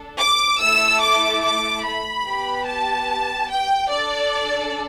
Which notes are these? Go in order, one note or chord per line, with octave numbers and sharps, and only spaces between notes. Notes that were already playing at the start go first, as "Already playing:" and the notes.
Already playing: D4 A4
D6
A3 E4 A4 E6
D6
D6
B5
B3 G4
A5
G5
D4 A4 D5